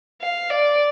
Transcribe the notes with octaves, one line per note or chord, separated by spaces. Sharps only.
F5
D5